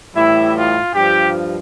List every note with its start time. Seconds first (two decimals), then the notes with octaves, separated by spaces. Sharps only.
0.15 A2 E3 G3 E4
0.55 F4
0.93 G2 F3 G4